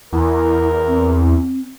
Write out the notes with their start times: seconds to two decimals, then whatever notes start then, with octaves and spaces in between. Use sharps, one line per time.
0.13 E2 E4 A#4
0.86 C4